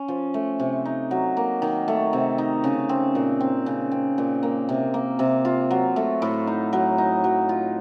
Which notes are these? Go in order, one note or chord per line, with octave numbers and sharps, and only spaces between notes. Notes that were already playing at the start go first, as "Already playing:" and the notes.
Already playing: C#4
F3
A3
C3
D#4
F#3
A#3
D#3
A3
C3
D#4
C#3
C4
A#2
C4
C#3
C4
A#2
A#3
C3
A#3
C3
F4
F#3
A3
A2
D#4
F#3
D#4
F#3
F4